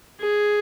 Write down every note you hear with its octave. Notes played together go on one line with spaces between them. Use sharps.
G#4